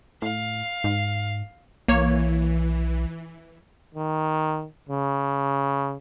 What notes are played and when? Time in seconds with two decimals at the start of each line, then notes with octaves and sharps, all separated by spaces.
0.22 A2 F5
0.84 G#2
1.88 B1 E3 A#3 C#5
3.95 D#3
4.89 C#3